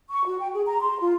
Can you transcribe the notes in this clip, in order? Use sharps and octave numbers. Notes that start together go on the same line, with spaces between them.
C#6
F#4
G5
G#4
A#5
C6
F4